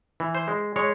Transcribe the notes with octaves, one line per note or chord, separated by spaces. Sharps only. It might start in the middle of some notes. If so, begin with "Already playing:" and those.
E3
C5
G#3
G#3 C#5